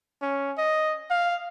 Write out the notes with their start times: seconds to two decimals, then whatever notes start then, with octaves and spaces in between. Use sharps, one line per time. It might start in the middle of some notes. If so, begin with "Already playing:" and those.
0.22 C#4
0.58 D#5
1.10 F5